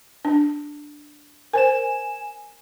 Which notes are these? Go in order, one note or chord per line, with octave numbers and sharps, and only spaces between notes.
D4
A#4 C5 G#5 E7